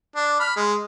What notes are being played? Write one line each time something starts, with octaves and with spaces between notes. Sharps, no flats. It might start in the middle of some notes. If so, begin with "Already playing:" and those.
D4
B5 F6
G#3